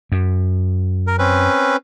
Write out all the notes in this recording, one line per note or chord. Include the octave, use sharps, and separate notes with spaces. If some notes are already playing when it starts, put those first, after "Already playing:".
F#2
A#4
C4 C#4 B4